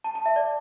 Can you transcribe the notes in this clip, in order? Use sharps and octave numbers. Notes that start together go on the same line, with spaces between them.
A5
A5
E5
D5